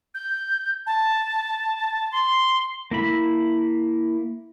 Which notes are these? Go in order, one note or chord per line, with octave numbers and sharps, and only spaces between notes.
G6
A5
C6
A#3 E4 B5